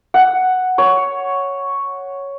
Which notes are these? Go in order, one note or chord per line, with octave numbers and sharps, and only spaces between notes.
F#5
C#5